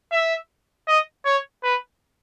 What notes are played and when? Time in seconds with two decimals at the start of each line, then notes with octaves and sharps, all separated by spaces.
0.12 E5
0.87 D#5
1.25 C#5
1.63 B4